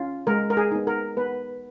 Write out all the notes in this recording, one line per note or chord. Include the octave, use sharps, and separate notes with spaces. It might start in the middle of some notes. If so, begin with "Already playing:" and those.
Already playing: C#4 F4
G#3 A#4
A#4
G#4
B3 D#4
A#4
B3 B4